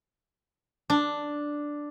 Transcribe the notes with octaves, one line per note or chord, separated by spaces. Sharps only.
D4